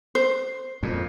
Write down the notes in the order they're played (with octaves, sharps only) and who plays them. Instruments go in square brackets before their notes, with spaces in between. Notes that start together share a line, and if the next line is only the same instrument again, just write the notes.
[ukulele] C5
[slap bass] F2 A#2